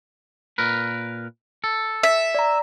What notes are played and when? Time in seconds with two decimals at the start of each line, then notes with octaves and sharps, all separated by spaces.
0.58 A#2 A#4 B4
1.64 A4
2.03 E5
2.35 D5 A#5